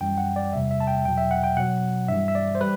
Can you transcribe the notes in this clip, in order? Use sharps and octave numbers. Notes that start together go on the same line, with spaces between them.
F#2 E3 G3 G5
F#5
D5
E2 C3 G3 E5
E5
A5
G5
E2 B2 F#3 G5
E5
F#5
G5
B2 F#3 F#5
G2 E3 G3 E5
E5
D5
C5
G3 B4